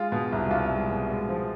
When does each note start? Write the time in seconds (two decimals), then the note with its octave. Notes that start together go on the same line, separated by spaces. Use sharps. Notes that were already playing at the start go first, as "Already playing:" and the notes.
Already playing: G#3 F4
0.12 B2
0.32 C2
0.51 C2 F4
0.71 G#3
0.91 B2
1.10 G#3
1.29 F3